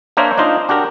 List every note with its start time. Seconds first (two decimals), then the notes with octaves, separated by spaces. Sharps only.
0.17 A#3 D4 A#4 C5 C#5 E5
0.38 D4 D#4 F4 C5 D#5
0.69 D4 F#4 G4 A#4